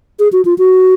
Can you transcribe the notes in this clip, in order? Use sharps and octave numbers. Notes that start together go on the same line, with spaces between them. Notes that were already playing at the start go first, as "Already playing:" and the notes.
G#4
F#4
F4
F#4